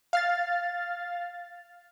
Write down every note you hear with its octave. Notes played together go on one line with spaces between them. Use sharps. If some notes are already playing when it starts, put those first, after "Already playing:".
F5 F6 A6